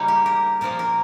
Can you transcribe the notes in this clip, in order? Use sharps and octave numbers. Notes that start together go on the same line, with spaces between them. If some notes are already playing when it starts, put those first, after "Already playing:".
Already playing: C#3 G3 A#3 C#4 D#4
G4
A#4
A#2 F3 A#3 A#4
A#4